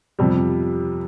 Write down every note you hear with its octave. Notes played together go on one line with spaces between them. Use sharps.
F2 C3 G3